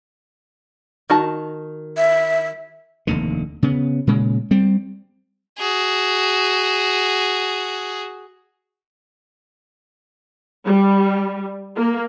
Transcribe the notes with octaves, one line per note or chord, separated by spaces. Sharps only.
D#3 F#4 A5
E5
F1 D#2 D3
C#3 B3
A#2 C#3 G#3
G3 C4
F#4 G#4
G3
A#3